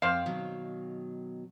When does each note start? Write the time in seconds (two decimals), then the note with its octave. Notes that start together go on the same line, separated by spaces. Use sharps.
0.02 F2 C5 D5 F5 G5
0.26 B2 D#3 F#3